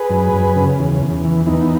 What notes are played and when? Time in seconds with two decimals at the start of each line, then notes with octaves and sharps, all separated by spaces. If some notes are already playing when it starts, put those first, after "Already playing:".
Already playing: G#4 B4
0.10 F#2
0.33 F#2
0.56 C#3
0.79 E2
1.02 E2
1.25 E3
1.46 E3 B3 D#4